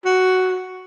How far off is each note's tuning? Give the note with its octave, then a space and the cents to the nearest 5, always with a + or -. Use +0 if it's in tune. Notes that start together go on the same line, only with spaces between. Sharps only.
F#4 +5